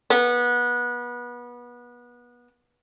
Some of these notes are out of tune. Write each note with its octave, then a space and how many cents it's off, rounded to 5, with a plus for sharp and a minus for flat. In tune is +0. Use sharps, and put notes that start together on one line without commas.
B3 -25